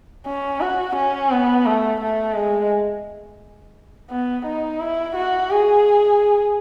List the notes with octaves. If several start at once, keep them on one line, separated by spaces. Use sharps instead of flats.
C#4
F#4
C#4
B3
A3
A3
G#3
B3
D#4
E4
F#4
G#4